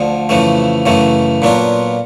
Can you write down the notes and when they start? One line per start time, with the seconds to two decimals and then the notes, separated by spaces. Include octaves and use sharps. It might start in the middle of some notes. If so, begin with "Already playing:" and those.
Already playing: D2 D3 F3
0.29 F2 C#3 E3 A3
0.86 F#2 C#3 E3 A3
1.42 A#2 F#3 B3 D4 F4